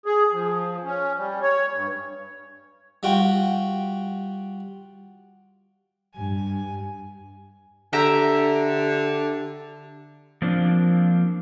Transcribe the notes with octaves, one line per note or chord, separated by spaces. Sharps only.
G#4
F3
C#4
G3
C#5
G2
G3 F4 F#4 G5
G2 G#5
D3 G4 E5 A#5
F3 A#3 C4 D4 F4